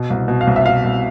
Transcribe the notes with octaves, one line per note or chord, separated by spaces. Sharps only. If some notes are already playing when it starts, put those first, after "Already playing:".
Already playing: B2
C2
B2
F5
C2
E5
B2 F5
C2